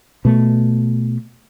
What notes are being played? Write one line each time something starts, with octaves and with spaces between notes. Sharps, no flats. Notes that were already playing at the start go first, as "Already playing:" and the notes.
B2 A3